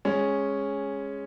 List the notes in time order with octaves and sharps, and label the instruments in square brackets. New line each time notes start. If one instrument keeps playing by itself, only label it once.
[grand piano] G#3 C#4